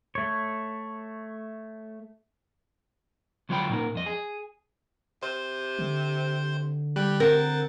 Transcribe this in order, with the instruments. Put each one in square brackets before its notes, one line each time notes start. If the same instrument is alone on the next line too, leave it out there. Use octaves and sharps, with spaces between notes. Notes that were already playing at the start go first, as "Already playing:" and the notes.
[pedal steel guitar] A3 C#5
[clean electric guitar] D2 F#3 F4 C#5 G5 B5
A#2 D#4 A#4 F#5
F2 D#5
G#4
[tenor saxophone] C3 [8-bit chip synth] C5
[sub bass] D3
[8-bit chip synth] G3 F#6 [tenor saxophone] G4
[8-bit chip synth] C4 F#5 A6 [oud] A#4